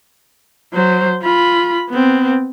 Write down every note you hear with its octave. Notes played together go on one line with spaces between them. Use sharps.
F#3 C5
F4 B5
B3 C4